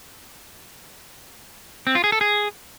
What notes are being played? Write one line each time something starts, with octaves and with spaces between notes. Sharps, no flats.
C4
F4
G#4
A4
G#4